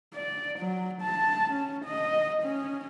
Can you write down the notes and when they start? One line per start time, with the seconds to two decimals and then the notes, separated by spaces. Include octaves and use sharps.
0.14 D5
0.59 F#3
1.02 A5
1.53 C#4
1.85 D#5
2.43 C#4